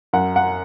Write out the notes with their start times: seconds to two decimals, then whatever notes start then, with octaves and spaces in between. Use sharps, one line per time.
0.13 F#2 F#5
0.36 F#5